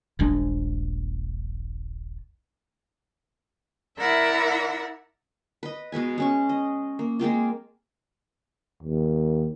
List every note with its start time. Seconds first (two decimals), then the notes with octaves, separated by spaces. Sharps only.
0.19 D#1 A#1 G#3 D4
3.99 E4 A#4 D5 E5 F#5
5.63 B4 D#5
5.92 B2 G#3 B4 G#5
6.18 G#3 C#4 C#6
6.49 D#5
6.99 A#3
7.19 G#3 A#3 C4 F4
8.83 D#2